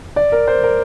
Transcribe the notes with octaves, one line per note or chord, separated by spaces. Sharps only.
D5
A#4
C5
A#4